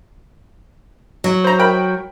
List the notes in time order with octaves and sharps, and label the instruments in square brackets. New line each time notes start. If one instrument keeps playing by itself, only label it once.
[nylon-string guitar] F#3
[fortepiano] C5 A#5
A#4 G5 B5